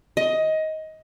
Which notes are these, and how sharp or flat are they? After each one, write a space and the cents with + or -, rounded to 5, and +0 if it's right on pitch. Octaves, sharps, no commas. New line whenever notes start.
D#5 +15